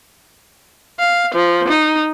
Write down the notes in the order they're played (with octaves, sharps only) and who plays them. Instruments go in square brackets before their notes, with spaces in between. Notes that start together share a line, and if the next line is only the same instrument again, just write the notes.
[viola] F5
F3
D#4